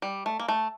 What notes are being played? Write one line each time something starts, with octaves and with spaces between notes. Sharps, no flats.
G3
A3
A#3
A3